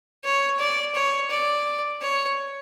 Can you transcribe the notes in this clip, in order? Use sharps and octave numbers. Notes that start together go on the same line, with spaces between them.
C#5
D5
C#5
D5
C#5